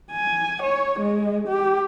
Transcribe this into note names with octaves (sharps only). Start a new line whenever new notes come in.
G#5
C#5
G#3
G4